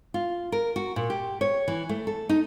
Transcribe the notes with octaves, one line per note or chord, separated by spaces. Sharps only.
F4
A#4
F#4
A#2
G4
C#5
E3
A3
A4
D#4